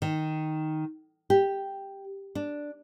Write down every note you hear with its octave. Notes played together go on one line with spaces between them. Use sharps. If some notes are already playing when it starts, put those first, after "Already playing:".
D#3
G4
D4